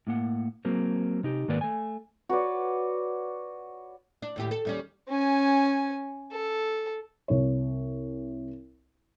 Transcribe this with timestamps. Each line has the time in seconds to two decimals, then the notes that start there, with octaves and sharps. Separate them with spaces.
0.07 A2 A#3 F#5
0.65 F#3 A#3 C4
1.23 C3 D#4 G4
1.48 G#2 D#3 A#3 B4 D5
1.61 A3 G#5
2.29 F#4 B4 C#5 D5
4.22 D4
4.36 D#2 A2 G4
4.51 A4
4.65 D#2 G3 C#4
5.09 C#4 G#5
6.32 A4
7.28 C2 C#5